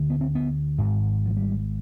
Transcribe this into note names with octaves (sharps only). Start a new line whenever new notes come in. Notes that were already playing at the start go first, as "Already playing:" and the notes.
Already playing: D2 D3
B3
C4
B3
G#1 G#2 G#3
F3
G3